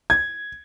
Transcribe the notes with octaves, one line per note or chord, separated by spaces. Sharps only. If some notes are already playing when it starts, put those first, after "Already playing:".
G#6